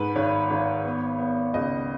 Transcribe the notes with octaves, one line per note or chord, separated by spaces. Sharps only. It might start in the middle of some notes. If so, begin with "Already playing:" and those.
Already playing: G#2 B4
G#1 C#5
G#1
B3
B3
C#2 D#5